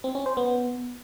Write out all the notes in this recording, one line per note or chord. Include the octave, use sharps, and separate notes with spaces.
C4
C#4
C5
B3